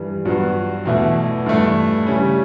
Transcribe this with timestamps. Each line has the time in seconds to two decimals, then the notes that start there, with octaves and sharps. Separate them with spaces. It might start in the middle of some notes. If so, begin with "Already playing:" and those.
Already playing: G2 E3 G3
0.25 G2 F#3 B3 F#4
0.85 E2 B2 A3 E4
1.46 G2 E3 A3 E4
2.07 C#3 G3 C#4